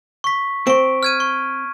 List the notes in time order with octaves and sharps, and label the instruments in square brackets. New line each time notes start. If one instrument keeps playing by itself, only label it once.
[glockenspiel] C#6 B6
[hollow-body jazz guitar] C4 [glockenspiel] C#6 D7
[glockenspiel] F6 G#6 D#7
C#6